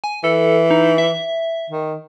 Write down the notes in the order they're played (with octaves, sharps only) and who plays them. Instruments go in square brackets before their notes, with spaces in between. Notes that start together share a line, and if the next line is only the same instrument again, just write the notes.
[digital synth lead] G#5
[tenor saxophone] E3 [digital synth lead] A4
[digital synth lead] D#4
E5
[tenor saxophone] D#3